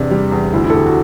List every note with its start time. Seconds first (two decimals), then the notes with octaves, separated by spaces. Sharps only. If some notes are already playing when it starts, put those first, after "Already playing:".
Already playing: E2 C3 D4
0.11 G3
0.32 E2
0.53 D2 E4
0.64 E4
0.70 A4
0.74 D2 G4
0.86 F#4